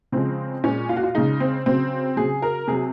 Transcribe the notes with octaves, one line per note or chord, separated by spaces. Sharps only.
C#3 F3 G#3 C4
A#2 G#3 C#4
F4
F#4
F4
C#3 G#3 D#4
C4
C#3 F#3 C4
C#3 F#3 G#4
A#4
C3 F#3 G#4